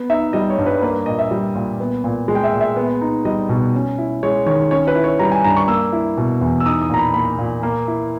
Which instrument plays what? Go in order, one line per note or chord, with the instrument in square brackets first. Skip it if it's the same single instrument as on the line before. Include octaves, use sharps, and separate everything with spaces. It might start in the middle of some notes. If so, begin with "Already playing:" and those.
Already playing: [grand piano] B3
D#4 E5
G3 D#5
C#5
G2
B4
A#3 B4
A#2 D#5
E5
G3
A#2
B3
A#2
G#3
G5
E5
A#2
E5
B3
D#4
G3 D#5
B2
C#4
E4
G#3 C#5
D#3 C#5
C#4 C#5
B4
E4
C#5
G3 A#5
G#5
G2 A#5
C#6
A#3 E6
E4
B2
E2
E6
D#4 D#6
D#6
A#2 A#5
B5
A#3 B5
A#2
A#3
E4